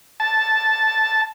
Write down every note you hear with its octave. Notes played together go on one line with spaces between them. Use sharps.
A5